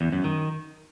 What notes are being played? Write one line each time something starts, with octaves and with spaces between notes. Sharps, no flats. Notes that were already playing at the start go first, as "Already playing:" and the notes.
E2
F#2
D#3